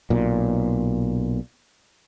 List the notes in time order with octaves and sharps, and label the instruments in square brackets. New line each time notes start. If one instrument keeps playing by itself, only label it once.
[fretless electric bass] B1 A#2